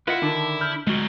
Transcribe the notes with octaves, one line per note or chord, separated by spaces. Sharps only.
E4 F4 B4 D#5 F#5
D3 D#3 D4 A5
B5 F6 G6
D2 F#3 G#3 F#4